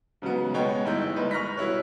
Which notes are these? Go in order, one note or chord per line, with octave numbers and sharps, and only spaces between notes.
G#2 C#3 F#3 B3
B2 G#3 B3 F#4 C#5 G5
G1 D#4 E4 G6
G1 G#2 B4
C#6 F6 F#6 A#6 B6
B2 G3 E4 C#5